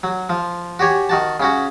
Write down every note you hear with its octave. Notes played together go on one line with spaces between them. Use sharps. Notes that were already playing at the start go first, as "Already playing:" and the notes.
F#3
F3
F#4 G4 C#5 G#5
D#3 F#4 A5
C#3 C#4 F#4